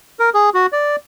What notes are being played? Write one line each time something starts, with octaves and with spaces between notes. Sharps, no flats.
A#4
G#4
F#4
D5